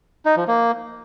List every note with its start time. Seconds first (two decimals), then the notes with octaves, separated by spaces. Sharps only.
0.25 D#4
0.37 F3
0.48 A#3